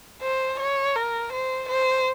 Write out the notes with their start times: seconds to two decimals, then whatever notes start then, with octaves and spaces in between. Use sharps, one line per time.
0.22 C5
0.59 C#5
0.95 A#4
1.33 C5
1.69 C5